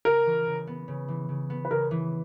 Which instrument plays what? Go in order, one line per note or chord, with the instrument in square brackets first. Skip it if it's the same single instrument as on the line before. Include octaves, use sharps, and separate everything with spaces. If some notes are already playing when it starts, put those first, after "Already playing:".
[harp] C#3 [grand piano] A#4
[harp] E3
C#3
B3
C#3
E3
C#3
B3
[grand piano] B4
[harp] C#3 [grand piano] A#4
[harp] E3